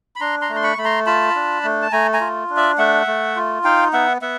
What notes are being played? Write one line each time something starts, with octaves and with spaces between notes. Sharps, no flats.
B5
D4 A#5 C6
A#5 C6
A3
C6
B5 C#6
A3 B5
A#5 C6
F4 A5 B5
D4
A3
A5
A3 G#5 A#5
G#5 A#5
F4
D4
D5 E5
A3 E5 F#5
A3
F4
D#4 F5 G5
B3 E5 F#5
B3 E5 F#5